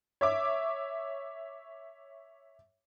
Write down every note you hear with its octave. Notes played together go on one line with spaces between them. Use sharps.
C#5 E5 D6